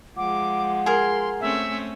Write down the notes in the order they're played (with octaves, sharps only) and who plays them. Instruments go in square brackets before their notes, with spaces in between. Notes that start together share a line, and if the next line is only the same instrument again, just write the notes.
[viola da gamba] F3 G#3 [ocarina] F#5 [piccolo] D6
[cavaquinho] G#4 A#4 [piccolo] C6
[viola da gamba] A3 C4 C#4 [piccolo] E5